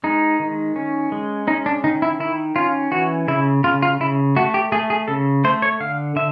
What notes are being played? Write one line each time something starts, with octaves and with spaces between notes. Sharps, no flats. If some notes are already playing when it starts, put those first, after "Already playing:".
G#3 D#4
D#3
C#4
G#3
C#4 D#4
D4
D#3 D#4
E4
D#3 E4
C#4 F4
E3 F#4
C#3 E4
C#3 F4
F4
C#3 E4
A3 F#4
G4
A3 G#4
G#4
C#3 A4
A3 C5
C#5
D3 F5
D3 E5